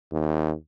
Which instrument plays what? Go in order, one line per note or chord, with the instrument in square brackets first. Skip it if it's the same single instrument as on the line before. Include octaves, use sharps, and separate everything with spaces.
[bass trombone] D#2